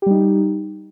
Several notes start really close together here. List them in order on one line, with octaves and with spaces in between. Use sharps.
G4 G3 D#4